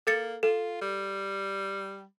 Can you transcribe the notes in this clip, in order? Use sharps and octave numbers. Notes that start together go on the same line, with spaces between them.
A#3 A4 A6 C#7
F4 A4
G3